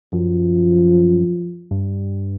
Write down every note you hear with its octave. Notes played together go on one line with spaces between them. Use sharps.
F#2 F3
G2